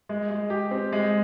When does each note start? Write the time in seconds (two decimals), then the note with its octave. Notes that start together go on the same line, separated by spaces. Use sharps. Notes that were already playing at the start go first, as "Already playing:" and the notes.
0.09 G#3
0.30 G#3
0.50 G4
0.71 C4
0.92 G#3